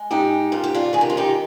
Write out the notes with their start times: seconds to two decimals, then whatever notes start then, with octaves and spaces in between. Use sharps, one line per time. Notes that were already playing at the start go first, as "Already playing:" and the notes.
Already playing: G#3
0.11 G#2 D#4 G4
0.52 G#2 F4
0.64 G4
0.74 D4 F4
0.93 D#3 G#4
1.01 G4
1.10 F4
1.17 D#4 G4